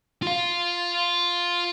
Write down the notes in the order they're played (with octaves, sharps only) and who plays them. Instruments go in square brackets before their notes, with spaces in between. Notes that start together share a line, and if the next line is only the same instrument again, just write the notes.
[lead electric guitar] F4 F5